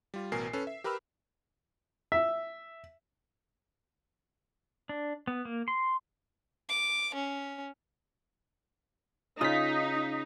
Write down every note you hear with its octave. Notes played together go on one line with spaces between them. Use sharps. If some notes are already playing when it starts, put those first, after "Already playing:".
G3 F4
A1 B2 A#4 G#5 C7
C#4 A4 B4
E5
G4 A#4 B4 B5 E6 F6
E5
D4
B3
A#3
C6
D6
C#4
C#3 D#4 F4 D#6 B6